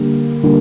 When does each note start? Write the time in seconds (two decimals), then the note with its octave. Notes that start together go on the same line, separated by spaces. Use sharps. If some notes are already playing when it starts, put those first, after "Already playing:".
Already playing: D3 G3 A#3
0.43 D3 G3 A#3